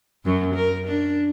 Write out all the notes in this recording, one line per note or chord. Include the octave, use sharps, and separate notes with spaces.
F#2 F#3
A#4
D4